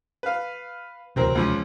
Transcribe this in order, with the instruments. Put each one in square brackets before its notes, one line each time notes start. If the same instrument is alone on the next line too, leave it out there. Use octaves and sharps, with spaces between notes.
[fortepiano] B4 F5
[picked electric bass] D1 E2 C3 [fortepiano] F#3 C4 A#4
[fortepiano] C#2 F3 C#4